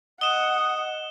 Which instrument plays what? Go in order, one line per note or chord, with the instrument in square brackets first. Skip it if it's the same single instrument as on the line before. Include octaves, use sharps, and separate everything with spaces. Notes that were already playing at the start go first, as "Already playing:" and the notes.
[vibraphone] D#5 [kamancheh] F#5 [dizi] D#6 [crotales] E7 G7